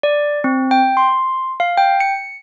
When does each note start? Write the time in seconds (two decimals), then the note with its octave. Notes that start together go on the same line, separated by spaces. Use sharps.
0.03 D5
0.44 C4
0.71 G5
0.97 C6
1.60 F5
1.78 G5
2.00 C#7